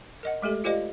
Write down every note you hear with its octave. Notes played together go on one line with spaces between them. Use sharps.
A#4 D#5 F#5
G#3 A3 G4 A4
F4 G4 C5 D5 D#5 F5